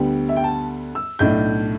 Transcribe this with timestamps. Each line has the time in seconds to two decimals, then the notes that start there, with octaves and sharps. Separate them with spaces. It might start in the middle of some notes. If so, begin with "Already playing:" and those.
Already playing: D2 D3 G3 B3 G5
0.29 E5
0.36 G5
0.44 A5
0.95 E6
1.19 B1 A2 A3 D4 G6